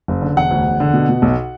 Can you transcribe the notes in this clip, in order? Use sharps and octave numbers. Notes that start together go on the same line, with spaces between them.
F#1
D3
E1 F#5
D2
E1
D3
B2
B2
B1